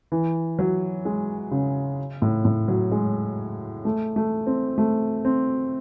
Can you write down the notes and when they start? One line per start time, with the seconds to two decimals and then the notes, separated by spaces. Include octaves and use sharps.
0.12 E3
0.59 F#3
1.05 G#3
1.51 C#3
2.22 A2
2.45 A2
2.68 F#3
2.92 G#3
3.85 A3
4.16 A3
4.47 C4
4.78 A3
5.25 C4